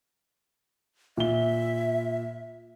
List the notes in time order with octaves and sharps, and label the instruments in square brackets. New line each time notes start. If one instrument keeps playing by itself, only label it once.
[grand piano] A#2 G7 [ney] E5